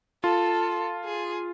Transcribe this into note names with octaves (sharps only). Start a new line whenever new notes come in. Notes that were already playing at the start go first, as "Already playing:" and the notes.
F4 A4
G#4